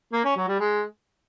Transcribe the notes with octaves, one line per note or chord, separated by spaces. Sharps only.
A#3
C#4
F#3
G3
G#3